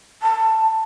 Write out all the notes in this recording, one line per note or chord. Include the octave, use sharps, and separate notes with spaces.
A5